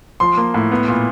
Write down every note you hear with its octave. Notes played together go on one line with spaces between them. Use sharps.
F3 C6
A#3
A2
B3
A#2